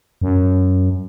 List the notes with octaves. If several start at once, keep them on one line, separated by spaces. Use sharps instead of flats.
F#2